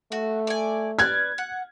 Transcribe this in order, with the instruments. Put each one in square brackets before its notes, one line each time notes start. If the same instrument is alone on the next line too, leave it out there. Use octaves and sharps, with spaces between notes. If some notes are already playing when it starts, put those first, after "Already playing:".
[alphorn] A3 [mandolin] F#4
[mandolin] D5 G#5
[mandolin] B4 D5 F6 [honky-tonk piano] G#6
[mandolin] F#5